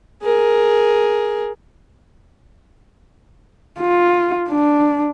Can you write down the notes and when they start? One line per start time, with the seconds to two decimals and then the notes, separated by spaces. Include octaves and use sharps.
0.23 G#4 A#4
3.81 F4
4.49 D4